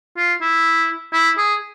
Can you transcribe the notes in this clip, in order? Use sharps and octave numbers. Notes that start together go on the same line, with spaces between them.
F4
E4
E4
G#4